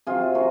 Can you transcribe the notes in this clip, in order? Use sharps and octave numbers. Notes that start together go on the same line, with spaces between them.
C3 F#3 F4 G#4
F#4 A#4